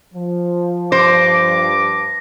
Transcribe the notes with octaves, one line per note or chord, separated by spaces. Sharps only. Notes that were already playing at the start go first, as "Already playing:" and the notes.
F3
G2 C5 D6 A#6